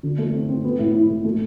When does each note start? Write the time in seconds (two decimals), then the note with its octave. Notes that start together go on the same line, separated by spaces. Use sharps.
0.03 D3
0.18 A3
0.34 C4
0.49 C4
0.64 B3
0.79 A2
0.95 E4
1.10 A2
1.24 A3